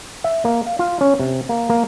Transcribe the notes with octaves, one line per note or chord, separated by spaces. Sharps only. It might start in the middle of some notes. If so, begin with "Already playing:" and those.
E5
A#3
F5
F4
C#4
C3
A#3
A#3